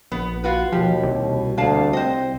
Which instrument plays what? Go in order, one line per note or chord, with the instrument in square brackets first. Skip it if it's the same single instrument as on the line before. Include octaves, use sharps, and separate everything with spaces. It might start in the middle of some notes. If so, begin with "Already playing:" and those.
[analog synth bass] A#1 [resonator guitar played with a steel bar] B3
[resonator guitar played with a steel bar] F4 F#4 B4
[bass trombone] D#2 [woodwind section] B2 [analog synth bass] F3 [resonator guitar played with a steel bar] G4
[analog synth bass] C2
[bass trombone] D2 [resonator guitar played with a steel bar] A#3 F5 A5
[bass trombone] C4 [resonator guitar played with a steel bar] C5 D#5